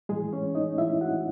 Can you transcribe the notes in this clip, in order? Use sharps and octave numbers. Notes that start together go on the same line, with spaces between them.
A2 E3 G#3 A3 G#4
C#4 C#5
D#4 D#5
A2 E3 A3 E4 E5
F#4 F#5